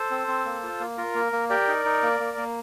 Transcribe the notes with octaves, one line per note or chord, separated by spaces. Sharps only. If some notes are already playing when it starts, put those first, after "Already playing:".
Already playing: A4 C5
C4
C4
A#3
F4
A#3
F4 A#4
A#3
A#3
G4 A#4 D5
D#4
D#4
A#3
A#3
A#3